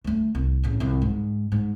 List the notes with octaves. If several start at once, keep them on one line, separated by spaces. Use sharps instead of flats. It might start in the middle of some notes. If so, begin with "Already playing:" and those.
D2 A3
C2
A1 C#3
C2 F2
G#2
G#2